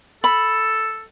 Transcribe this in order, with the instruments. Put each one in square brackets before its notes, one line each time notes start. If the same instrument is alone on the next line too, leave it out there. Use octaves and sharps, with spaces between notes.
[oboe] A4 [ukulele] B5